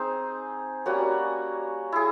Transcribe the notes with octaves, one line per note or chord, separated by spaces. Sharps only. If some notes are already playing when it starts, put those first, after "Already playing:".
Already playing: C4 D#4 G#4 C5
G3 A#3 C#4 F#4
E4 G#4